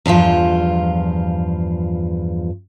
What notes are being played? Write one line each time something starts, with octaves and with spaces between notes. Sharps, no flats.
E2 G2 F3 F4